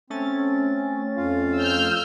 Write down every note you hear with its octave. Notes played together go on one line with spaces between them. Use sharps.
A3 C4 C#4 A6
F2 F4 F5
E6 F6 G6